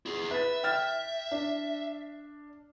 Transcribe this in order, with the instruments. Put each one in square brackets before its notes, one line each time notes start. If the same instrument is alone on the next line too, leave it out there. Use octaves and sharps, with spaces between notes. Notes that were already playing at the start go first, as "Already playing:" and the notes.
[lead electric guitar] E4 G#4
[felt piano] B4 A6 [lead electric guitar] E5
[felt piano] G5 F6 A6
D4